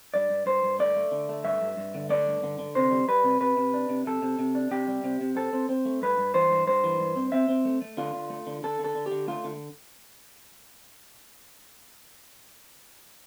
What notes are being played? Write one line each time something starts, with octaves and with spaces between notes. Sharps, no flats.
G2 D5
G2
G2 C5
G2
A3 D5
A3
D3
A3
G2 E5
G2
G2
D3
A3 D5
G2
D3
D3
C3 C5
G3
G3 B4
C3
C3 B4
C3
D4
C3
C3 A4
C3
C3
D4
C3 G4
G3
C3
C3
C4 A4
C4
C4
A3
G2 B4
G2
E3 C5
G2
G2 C5
E3
G2
C4
C4 E5
C4
A3
A3
D3 F4
D3
A3
D3
D3 A4
D3
A4
D3
G4
D3
A3 F4
D3